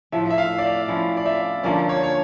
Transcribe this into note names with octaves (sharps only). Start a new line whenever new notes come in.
A2 F3 A3 E5
E5
F5
D5
E5
F3 C#4 E4
D5
E5
D3 F3 A#3 C#4 D5
C#5
C#5